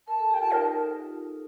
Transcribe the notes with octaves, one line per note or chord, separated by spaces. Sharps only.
A#4 A5
A4
G4 G5
F4 A5
D#4 A#4